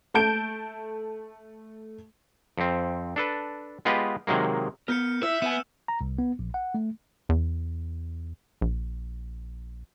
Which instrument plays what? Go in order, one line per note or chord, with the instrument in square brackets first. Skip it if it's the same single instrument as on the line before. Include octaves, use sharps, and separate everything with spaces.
[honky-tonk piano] A3 A5 G6 D7
[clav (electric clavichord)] F2 C4
D4 A4 B4
G#3 B3 F4 G4 B4 D#5
C3 D#3 F#3 G#3 A#3
[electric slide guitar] B3 A#4 [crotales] F6 G6 C#7
[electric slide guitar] E4 [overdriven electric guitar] E5 [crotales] E6
[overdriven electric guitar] B3 [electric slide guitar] E5 G#5 [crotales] E7
[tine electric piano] A#5
C2
B3
A#1
F#5
A3
[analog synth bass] E2
A#1